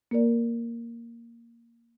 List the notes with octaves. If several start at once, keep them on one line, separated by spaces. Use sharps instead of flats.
A#3 A#4 D5